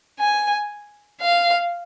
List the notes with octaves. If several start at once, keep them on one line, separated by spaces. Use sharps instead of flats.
G#5
F5